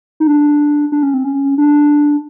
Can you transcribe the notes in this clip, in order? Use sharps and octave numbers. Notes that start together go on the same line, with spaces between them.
D#4
D4
D4
C#4
C4
C#4
D4